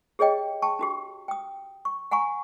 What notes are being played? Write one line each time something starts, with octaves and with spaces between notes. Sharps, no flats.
G4 G#4 C#5 D#5 G5
G5 A5 C#6
D4 F#4 G4
G5 D#6
C#6
F#5 G#5 A#5 C#6